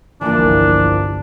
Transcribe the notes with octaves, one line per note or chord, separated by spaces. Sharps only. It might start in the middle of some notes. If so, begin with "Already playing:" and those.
G1 C2 E3 F3 A#3 D4